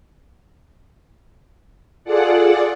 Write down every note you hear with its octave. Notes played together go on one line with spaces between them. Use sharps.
F4 G#4 A4 D5 F#5